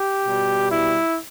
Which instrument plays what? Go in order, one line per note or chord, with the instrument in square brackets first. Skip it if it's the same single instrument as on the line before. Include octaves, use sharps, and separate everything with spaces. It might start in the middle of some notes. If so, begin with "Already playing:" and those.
Already playing: [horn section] G4
B2 G3
E4